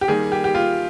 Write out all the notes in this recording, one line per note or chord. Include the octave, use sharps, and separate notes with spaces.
G4
D#3 G3 A#3 G#4
G4
G4
F4